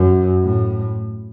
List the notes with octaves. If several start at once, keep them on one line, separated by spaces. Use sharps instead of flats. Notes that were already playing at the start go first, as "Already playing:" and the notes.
Already playing: F#2
A2